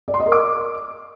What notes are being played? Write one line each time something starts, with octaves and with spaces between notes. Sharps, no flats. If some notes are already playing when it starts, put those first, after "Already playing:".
D5
C6
D#5
A#4
D6